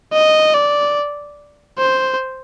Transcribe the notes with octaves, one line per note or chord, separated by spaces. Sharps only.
D#5
D5
C5